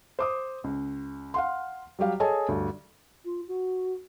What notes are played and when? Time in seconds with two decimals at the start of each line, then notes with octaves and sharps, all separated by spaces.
0.19 C5 D6 D#6
0.64 C#2
1.34 F5 F#5 C6
1.99 F#3 G3 G4 F5
2.20 G#4 A4 C#5 D#5 G#5 A5
2.48 D2 G2
3.25 F4
3.47 F#4